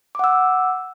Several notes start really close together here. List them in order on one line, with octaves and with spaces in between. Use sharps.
D6 F#5 E6